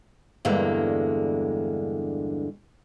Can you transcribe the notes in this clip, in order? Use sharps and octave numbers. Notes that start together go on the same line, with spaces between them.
E2 G2 D3 G#3 A#3